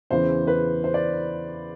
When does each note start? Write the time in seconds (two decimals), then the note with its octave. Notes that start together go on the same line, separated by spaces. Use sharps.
0.10 E2 C#3 E3 C5
0.47 B4
0.84 C5
0.94 D5